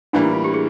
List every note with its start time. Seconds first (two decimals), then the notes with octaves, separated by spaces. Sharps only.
0.13 A2 E3 G3 A#3 D4
0.24 E4
0.33 F4
0.44 G4
0.54 G#4